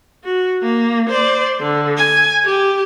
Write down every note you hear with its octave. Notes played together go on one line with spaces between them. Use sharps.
F#4
A#3
C5 D5
D3
G#5
G4